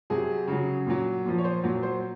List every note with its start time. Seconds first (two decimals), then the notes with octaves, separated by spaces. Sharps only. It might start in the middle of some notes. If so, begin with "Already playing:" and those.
0.10 C3 F#3 G#4
0.48 C#3 F#3
0.87 A#2 F#3
1.25 A#2 F3
1.38 C#5
1.44 C5
1.64 A#2 F#3
1.83 C5